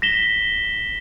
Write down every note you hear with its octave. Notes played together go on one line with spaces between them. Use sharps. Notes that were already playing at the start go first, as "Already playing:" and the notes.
A#6 B6 E7 G7